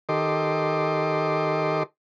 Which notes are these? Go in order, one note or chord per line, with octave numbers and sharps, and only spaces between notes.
D#3 G4 A4 D#5 C6 D6